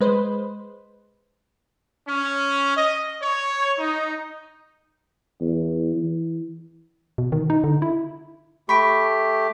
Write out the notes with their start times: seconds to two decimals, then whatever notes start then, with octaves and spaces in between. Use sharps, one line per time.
0.01 G#3 B4 C5
2.06 C#4
2.76 D#5
3.21 C#5
3.78 D#4
5.40 E2
5.96 E3
7.18 B2
7.32 D#3
7.50 D#4
7.64 D3
7.82 E4
8.69 A3 G4 B5 C#6 B6 D7